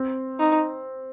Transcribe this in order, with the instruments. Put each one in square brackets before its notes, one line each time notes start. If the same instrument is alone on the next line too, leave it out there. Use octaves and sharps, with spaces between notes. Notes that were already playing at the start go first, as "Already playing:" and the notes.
Already playing: [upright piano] C4
[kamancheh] D#4